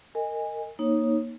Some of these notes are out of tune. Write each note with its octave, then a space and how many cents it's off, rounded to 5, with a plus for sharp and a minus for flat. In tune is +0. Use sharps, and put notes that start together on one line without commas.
A#4 -25 D#5 +0 G#5 -15
A#3 +20 D#4 +0 C#5 -15